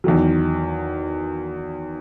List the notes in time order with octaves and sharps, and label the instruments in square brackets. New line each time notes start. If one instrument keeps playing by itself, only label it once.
[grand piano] E2 D#3 F#3